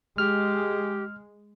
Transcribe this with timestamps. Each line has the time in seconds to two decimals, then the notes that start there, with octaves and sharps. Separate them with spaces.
0.18 G#3 G4 F6